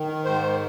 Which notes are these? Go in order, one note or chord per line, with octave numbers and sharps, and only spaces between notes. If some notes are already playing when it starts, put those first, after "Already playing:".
Already playing: D#3
G#2 C5